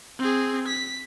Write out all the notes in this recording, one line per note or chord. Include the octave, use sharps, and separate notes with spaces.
C4 G#4
B6